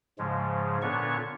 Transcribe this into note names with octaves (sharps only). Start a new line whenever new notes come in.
G#2 C#3 F3 G#3
A#2 D3 B3 D4 C#5 C#6